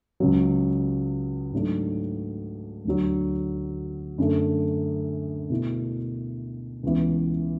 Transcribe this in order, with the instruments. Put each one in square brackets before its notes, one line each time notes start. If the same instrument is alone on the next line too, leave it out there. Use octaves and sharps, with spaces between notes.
[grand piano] C#2 C#3 F#3
G#2 F#3 A3 D4
D2 D3 F#3
F#2 D3 A3
B2 A3 E4
C#2 C#3 E3 B3